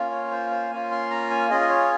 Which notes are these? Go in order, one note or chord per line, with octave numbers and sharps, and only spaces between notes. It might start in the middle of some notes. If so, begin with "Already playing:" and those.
Already playing: A#3 C#4 F4
C#5
C5
C5
A#3 C#4 F4 G#5
C6
A#5
G#5
C#4 F4 G#4 D#5
D#5
C#5